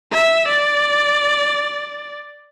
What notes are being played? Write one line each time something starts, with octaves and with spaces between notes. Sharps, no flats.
E5
D5